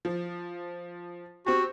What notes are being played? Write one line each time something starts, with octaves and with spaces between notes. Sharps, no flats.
F3
C4 F#4 G4